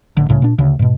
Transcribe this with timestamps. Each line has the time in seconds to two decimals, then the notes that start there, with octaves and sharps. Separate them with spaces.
0.17 A1 D3
0.29 C2 A2 C#3
0.42 A#2 D4
0.58 D2 C#3
0.79 G#2 B2